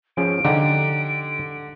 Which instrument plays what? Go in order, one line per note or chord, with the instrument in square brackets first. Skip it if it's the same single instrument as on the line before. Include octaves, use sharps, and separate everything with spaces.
[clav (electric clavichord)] F3 C#4 G#4 [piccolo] D7
[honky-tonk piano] D3 [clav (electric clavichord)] D#4 G4 D5